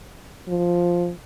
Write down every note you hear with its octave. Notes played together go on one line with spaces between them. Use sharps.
F3